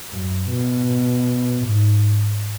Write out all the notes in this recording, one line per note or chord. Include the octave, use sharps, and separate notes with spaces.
F#2
B2
G#2